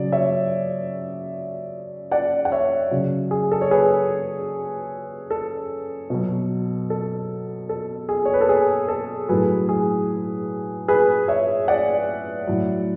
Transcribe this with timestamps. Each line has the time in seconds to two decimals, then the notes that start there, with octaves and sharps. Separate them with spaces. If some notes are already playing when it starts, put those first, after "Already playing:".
Already playing: C#3 F#3 D5
0.12 C#5 E5
2.11 D5 F#5
2.45 F#5
2.52 C#5 E5
2.91 C#3 F#3
3.31 G#4
3.52 A4
3.61 C#5
3.71 G#4 B4
5.30 A4
6.10 B2 F#3
6.90 A4
7.69 A4
8.09 G#4
8.25 C#5
8.34 B4
8.41 A4
8.49 G#4
8.89 A4
9.29 A2 F#3 G#4 B4
9.69 G#4
10.88 G#4 B4
11.28 C#5 E5
11.68 D5 F#5
12.47 A2 F#3